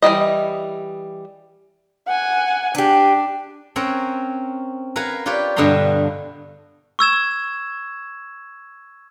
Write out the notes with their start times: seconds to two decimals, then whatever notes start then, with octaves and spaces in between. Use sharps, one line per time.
0.02 E3 F3 G3 D#5
2.07 F#5 G#5
2.75 D4 G4 B4
3.76 C4 C#4 A#4 C#5 F#5
4.96 A#4 B4 F5 F#5 G#5
5.26 F4 G4 B4 C#5 D5
5.56 G2 B2 D3 B3 A#5 C6
6.99 C#6 E6 G#6 E7